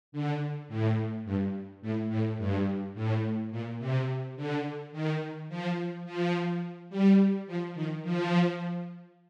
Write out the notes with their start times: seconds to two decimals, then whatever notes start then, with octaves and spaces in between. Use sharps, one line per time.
0.12 D3
0.68 A2
1.25 G2
1.82 A2
2.09 A2
2.38 G2
2.94 A2
3.51 A#2
3.79 C3
4.36 D3
4.92 D#3
5.49 F3
6.05 F3
6.90 G3
7.47 F3
7.74 D#3
8.03 F3